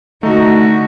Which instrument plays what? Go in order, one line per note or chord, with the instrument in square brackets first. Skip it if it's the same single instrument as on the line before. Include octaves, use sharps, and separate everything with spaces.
[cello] D3 F#4 [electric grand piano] A3 [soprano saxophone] D#4